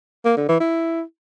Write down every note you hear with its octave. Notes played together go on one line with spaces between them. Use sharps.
A#3
D3
E3
E4